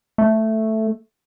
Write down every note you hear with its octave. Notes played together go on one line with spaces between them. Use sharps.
A3